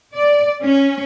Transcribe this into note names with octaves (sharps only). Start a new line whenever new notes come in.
D5
C#4